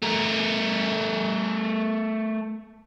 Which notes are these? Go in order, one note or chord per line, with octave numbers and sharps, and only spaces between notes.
A3 A#4